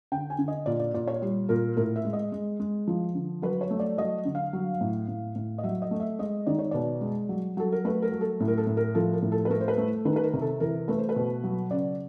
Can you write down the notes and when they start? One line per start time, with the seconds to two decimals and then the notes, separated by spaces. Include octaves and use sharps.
0.12 D3 G5
0.30 G#5
0.39 D3
0.48 D#5
0.66 A#2 D5
0.80 D5
0.94 A#2 D5
1.07 C#5
1.22 G3
1.49 A#2 A#4
1.77 A2 A#4
1.96 E5
2.05 G#3
2.13 D#5
2.32 G#3
2.60 G#3
2.87 F3
3.15 D3
3.42 F#3 B4
3.61 C#5
3.70 A3
3.80 D5
3.97 F#3 D#5
4.25 D3
4.35 F5
4.53 F#3
4.81 A2
5.08 A2
5.35 A2
5.58 D#5
5.63 F#3 E5
5.82 D#5
5.91 A3
6.00 E5
6.19 G#3 D#5
6.47 D#3 D5
6.59 C#5
6.71 B2 D5
7.01 G#3
7.29 F#3
7.57 F#3 A4
7.72 A#4
7.85 A3 B4
8.02 A#4
8.11 F#3
8.21 A4
8.40 A2
8.48 A#4
8.57 A4
8.67 A2
8.77 A#4
8.95 F3 A4
9.13 A#4
9.22 A2
9.32 A4
9.45 B4
9.50 A3 A#4
9.61 C5
9.68 B4
9.78 A3
10.05 D#3 B4
10.16 B4
10.23 A#4
10.33 C3
10.42 A4
10.60 E3 A#4
10.88 A3 B4
10.98 C5
11.09 B4
11.16 B2
11.43 F#3
11.71 C#3 D5